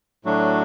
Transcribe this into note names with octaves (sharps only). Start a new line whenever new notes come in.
A2 F#3 A3 D4 F#4